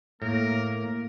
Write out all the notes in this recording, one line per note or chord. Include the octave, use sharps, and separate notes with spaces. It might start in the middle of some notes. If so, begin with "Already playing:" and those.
A2 A#3 A#4